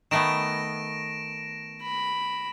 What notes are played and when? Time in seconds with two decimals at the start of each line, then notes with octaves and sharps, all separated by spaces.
0.11 D#3 A3 B3 A#6 D7 E7
1.82 B5